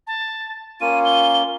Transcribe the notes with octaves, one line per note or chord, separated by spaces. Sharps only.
A5
A#3 C#4 F4 D#7
G7